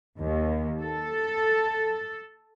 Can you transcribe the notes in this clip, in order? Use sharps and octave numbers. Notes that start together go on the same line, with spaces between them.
D#2
A4